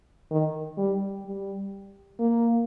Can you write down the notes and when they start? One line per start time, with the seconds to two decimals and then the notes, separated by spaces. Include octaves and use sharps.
0.31 D#3
0.78 G3
1.26 G3
2.20 A#3